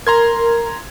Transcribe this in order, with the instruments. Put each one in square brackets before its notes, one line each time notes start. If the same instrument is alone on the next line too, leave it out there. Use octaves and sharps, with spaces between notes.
[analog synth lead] A#4 [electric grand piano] A#5 C6 G#6